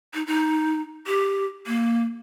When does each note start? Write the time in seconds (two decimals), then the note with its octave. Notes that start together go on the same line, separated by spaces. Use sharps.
0.14 D#4
0.27 D#4
1.07 G4
1.67 A#3